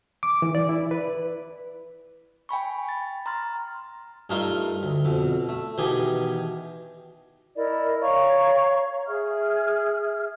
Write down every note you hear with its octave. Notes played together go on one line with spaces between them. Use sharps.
D6
E3
D5
E4
B4
G5 G#5 B5 C#6
A6
A#5 C6 F6 A6
G2 A3 D#4 F4 A#4 C6
D2
F2 B2
A3
B2 D#3 E3 B3 G4 G#4
E4 A#4 D5 D#5
C#5 F5 A#5 C#6
G#4 E5 F6